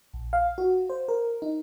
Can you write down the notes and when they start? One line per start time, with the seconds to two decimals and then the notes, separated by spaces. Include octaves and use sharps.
0.13 A#1
0.33 F5
0.58 F#4
0.90 C5
1.08 A#4
1.42 D#4